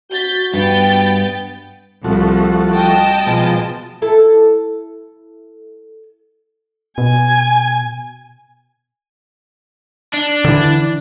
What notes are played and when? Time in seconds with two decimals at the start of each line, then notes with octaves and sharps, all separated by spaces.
0.11 F#4 G6 A6 B6
0.54 G2 B3 G5 A6
2.04 C2 F3 A3 F#4
2.73 D#5 G5 A5
3.26 B2 F3 G#3
4.02 E4 A4
6.98 B2 G#5
10.14 D4
10.45 D3 E3